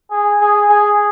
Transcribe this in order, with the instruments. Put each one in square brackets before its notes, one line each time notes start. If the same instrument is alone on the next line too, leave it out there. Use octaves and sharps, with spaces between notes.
[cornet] G#4
G#4
G#4